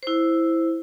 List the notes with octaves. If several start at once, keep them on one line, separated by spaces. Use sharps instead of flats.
E4 C5